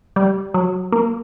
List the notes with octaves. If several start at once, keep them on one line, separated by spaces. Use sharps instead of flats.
G3
F#3
A#3